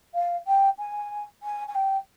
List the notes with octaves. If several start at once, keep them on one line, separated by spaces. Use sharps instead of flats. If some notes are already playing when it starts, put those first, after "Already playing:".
F5
G5
G#5
G#5
G#5
G5